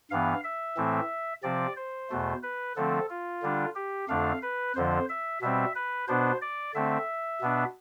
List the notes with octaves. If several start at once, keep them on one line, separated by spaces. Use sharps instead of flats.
G2 E3 B3 F5
E5
A2 E3 A3 C4
C3 F3 C4 D5
C5
E2 B2 A3
B4
D3 F3 A3 C4 A4
F4
D3 G3 D4
G4
F2 D3 A3 D4 F5
B4
F2 D3 F3 C5
E5
B2 G3 C4 E5
B4
B2 B3 D4 C5
D5
D3 A3 C4 E5
B2 B3 D4